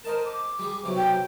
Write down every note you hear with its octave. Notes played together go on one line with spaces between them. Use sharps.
A#4 C5 D#5 A5
D6
G3 G#4
B1 C3 F#3
G5